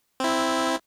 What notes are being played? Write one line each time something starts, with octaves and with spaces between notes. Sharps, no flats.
C4 E4